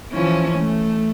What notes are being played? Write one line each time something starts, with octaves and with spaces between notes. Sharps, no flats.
E3 F3 C#4
A3